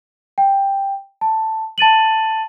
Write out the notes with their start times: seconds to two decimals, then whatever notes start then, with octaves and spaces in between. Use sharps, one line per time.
0.38 G5
1.21 A5
1.78 A5 A6 D#7 F#7